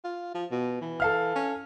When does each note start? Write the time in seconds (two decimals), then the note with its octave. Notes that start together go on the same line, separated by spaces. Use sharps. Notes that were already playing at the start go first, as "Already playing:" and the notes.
0.04 F4
0.34 F3
0.51 B2
0.82 E3
1.00 A4 F5 F6
1.36 C#4